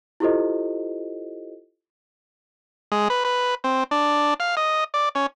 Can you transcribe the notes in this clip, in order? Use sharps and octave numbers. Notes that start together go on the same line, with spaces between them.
E4 F4 G4 A4 C5 D#5
G#3
B4
B4
C4
D4
F5
D#5
D5
C#4